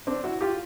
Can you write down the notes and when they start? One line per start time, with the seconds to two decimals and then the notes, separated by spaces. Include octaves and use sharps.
0.07 C4 D4
0.24 E4 F#4
0.41 F4 G4